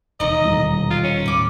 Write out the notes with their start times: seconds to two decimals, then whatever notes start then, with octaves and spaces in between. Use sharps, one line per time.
0.20 E1 D#2 D#4 D#5 A#5
0.45 D#1
0.91 F4
1.04 C#4
1.26 D#2 A2 G3 B5 D6